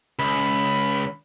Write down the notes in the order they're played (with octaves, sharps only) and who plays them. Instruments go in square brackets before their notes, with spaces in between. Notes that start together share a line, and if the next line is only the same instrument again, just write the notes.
[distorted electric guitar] C#2 [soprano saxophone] B5